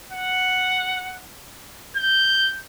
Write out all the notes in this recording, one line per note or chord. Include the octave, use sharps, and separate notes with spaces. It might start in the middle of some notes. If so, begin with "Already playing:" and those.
F#5
G6